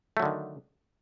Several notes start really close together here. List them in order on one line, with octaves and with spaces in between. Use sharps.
A3 F#3 D3 D#3